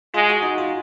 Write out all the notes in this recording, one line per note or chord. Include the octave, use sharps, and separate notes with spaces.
G#3 F4
F#4
D#4
F4